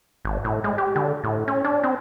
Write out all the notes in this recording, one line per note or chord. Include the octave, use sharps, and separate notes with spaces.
G#1
A2
G#3
G4
D3
A2
C#4
D4
C4